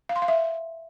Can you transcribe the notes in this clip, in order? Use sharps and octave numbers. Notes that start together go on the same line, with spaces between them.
F5
C6
F5
E5